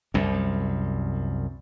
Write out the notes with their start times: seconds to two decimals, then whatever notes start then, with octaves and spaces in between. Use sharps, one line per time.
0.14 C2 F#2